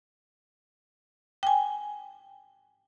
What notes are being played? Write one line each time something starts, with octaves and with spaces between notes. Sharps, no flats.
G5 G#5